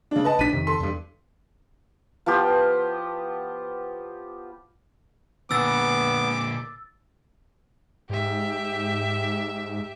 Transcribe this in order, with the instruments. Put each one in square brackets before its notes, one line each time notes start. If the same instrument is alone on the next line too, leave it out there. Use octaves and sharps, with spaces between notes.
[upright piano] C#3 D4
B4 D#5 A5
[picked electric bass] A#1 D4 [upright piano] B6 D#7
[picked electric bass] F2 C3 D#3
[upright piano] A4 C6
[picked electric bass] E2 G2
[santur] F3 B3 F4 G4
[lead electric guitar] A#2 D3 [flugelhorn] B3 [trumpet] D6 [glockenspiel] E6 A6
[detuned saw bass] G#2 [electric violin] G4 E5